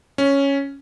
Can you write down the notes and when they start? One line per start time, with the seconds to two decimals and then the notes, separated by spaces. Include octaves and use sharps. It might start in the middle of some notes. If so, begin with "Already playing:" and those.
0.18 C#4